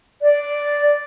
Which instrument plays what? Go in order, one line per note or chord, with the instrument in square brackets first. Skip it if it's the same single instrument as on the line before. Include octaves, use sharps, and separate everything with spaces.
[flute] D5